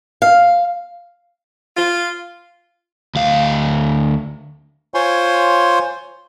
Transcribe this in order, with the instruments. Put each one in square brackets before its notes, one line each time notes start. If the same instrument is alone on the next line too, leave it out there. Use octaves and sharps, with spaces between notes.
[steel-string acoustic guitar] F5
[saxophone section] F4
[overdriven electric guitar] D2 F5
[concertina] F4 C5 C#5 G#5 C6